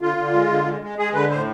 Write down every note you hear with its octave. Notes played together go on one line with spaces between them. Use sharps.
D3 F4
D3
G#3
D3
G#3
G#3
G#3 G#4
D3 B4
A2 C5